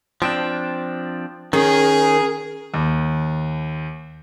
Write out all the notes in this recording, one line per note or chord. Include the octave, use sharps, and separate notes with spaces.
F3 C4 D4 G5
D#3 C#4 G#4 A#4
D#2